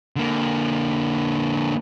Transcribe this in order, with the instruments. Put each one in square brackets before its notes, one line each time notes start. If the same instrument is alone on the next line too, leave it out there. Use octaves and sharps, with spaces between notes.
[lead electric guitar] D3 A#3